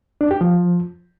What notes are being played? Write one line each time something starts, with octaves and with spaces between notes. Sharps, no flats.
D4
G4
F3